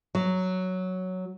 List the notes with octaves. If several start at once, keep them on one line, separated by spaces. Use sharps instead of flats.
F#3